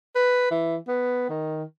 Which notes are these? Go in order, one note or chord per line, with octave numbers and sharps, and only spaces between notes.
B4
E3
B3
D#3